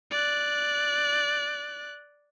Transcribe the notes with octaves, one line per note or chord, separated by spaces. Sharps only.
D5 F#6